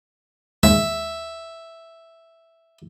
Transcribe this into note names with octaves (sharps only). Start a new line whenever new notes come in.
D#2 G#3 E5